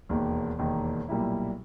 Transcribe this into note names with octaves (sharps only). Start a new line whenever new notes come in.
E1 D#2 D#3 A#3
E1 D#2 D#3 A#3
B1 A#2 G3 A#3 E4